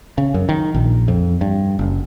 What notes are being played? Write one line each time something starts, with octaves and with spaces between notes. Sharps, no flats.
C#3
F#2
D#3
A#1
F2
G2
F#1